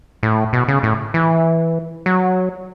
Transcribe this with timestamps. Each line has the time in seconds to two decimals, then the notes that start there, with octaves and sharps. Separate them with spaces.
0.23 A2
0.53 B2
0.68 C#3
0.83 A2
1.14 E3
2.06 F#3